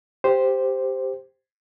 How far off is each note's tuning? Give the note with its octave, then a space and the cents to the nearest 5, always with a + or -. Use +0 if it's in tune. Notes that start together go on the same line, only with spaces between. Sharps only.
G4 +0 C5 -5